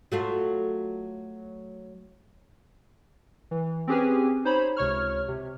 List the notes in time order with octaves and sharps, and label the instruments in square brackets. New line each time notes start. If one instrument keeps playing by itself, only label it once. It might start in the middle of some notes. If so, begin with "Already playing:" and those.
[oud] F#3 A3 F4
[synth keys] E3
C4 C#4 G4 G#4 B4 G#5
D#4 C5 C#5 B5
C#2 C3 C#5 C#6 F6
C3